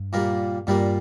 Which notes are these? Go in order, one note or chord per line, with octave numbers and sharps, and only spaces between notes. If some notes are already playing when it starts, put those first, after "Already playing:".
Already playing: G2
A#2 G3 A#3
G2 A#2 G3 A#3